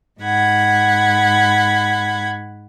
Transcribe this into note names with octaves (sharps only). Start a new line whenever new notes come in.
G#2 F#5 B5 G#6